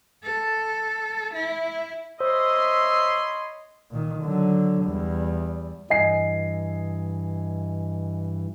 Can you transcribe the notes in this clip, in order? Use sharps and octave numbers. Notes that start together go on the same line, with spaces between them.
A4
E4
C5 C#5 D#5 E5 B5 C6
A#2 D#3
D3 F#3
E2 G3
G2 E3 D#5 G#5 C7